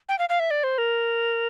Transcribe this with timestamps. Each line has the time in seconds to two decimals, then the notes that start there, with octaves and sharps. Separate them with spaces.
0.09 G5
0.19 F5
0.29 F5
0.40 E5
0.51 D5
0.64 C5
0.78 A#4